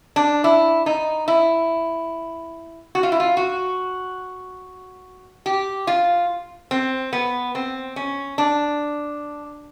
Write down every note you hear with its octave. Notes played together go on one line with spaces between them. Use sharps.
D4
E4
D#4
E4
F#4
F4
E4
F4
F#4
G4
F4
C4
B3
C4
C#4
D4